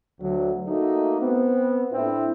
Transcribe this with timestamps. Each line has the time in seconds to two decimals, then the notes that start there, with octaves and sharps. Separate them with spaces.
0.21 D2 F#3
0.67 A3 A#3 D#4 F#4
1.21 B3 C4
1.92 A2 C4 D4 E4